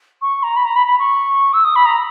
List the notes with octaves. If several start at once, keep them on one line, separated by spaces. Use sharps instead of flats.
C#6
A#5
B5
A#5
B5
B5
C#6
E6
D#6
B5
A#5